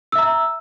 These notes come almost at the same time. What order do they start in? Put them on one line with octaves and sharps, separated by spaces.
E6 E5 A#5